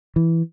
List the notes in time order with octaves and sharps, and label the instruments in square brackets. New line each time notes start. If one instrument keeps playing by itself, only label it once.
[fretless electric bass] E3